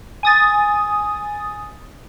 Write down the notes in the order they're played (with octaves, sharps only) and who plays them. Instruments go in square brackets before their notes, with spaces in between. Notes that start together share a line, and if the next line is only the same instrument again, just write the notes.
[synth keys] G#5 D#6 A6